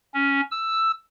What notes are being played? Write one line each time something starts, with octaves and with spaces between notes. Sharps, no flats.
C#4
E6